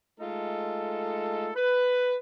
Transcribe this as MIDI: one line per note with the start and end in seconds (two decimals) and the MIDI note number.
0.19 1.50 56
0.19 1.50 57
0.19 1.50 63
0.19 1.50 65
0.19 1.50 69
1.55 2.16 71